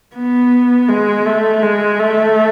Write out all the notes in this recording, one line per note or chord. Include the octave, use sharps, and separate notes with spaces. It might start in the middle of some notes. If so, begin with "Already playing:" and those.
B3
G#3
A3
G#3
A3